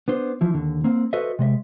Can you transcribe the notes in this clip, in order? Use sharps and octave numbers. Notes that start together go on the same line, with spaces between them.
B3 D4 C5
E3 F3 E4
D#2 D3
A#3 C4
F#4 A4 B4 C5 D#5 E5
C3 G#3 D#5 E5